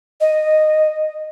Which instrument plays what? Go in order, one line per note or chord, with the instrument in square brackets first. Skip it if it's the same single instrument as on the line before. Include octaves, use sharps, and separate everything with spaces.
[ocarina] D#5